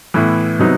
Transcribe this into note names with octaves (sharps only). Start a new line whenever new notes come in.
A2 E3 B3 E4
C3 F#3 B3 D#4